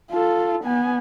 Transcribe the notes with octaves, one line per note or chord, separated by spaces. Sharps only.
F4 A4
B3 G#5